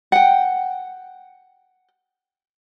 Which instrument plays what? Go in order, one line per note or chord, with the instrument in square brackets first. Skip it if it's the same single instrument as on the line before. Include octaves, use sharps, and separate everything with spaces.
[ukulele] F#5 G5